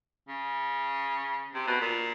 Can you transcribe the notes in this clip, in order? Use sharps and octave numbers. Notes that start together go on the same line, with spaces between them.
C#3
C3
B2
A#2